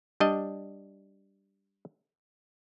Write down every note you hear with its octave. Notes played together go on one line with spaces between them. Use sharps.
G3 D4 D#5